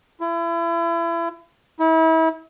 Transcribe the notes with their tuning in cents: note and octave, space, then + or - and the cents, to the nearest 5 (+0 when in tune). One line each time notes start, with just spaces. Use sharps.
E4 +35
E4 -35